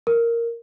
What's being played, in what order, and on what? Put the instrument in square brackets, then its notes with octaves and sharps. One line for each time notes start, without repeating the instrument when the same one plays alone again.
[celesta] A#4